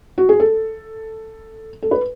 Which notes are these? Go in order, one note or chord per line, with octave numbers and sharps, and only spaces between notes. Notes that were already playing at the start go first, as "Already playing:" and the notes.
F#4
G#4
A4
A4
B4